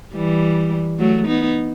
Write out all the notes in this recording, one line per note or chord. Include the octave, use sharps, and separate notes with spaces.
E3 G3
F#3 A3
B3 D#4